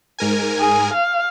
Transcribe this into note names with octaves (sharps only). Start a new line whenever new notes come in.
G#2 A#4 G#5
G#4
F5